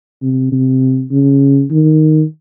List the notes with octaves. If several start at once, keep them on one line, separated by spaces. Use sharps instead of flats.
C3
C3
C#3
D#3